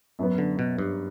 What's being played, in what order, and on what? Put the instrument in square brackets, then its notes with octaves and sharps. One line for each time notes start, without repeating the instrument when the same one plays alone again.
[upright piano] F#2 F#3 B3
[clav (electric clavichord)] D3
B2
G2